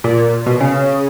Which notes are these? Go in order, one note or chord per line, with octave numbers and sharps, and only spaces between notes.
A#2
B2
C#3